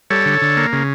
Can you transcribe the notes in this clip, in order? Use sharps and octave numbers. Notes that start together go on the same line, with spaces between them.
G3 A4 C#5
D3
D3
A#3
C#3